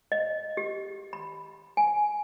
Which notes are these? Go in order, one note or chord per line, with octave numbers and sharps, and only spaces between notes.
D#5
G4
B5
G#5